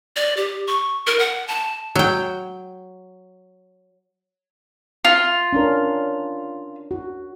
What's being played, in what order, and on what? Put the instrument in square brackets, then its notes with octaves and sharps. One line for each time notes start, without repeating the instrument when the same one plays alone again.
[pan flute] D5
G4
C#6
A#4
F#5
A5
[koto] F#3 G5
[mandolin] F4
[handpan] C#4 D4 A#4
F#4